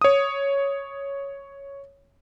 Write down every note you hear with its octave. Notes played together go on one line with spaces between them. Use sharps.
C#5 D#6